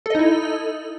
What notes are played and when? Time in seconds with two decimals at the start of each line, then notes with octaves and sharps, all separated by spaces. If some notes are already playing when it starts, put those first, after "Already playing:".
0.06 A4
0.10 D#5
0.15 D#4
0.19 E4